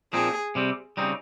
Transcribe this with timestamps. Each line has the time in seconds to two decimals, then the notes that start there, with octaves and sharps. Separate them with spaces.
0.13 A#2 F3 C4 D#4 G#4
0.55 C3 G3 C4
0.97 C#3 G3 C4 D#4